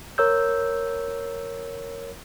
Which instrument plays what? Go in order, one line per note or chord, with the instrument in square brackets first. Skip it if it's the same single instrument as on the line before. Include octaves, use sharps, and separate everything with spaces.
[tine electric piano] A#4 C#5 E6 G6